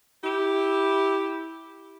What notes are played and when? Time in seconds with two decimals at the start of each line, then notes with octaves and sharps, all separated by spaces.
0.24 E4 G4